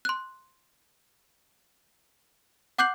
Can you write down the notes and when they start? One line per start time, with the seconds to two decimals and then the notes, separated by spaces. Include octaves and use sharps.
0.05 C6 F#6
2.78 F#5 D6 F#6 G6 C7 F#7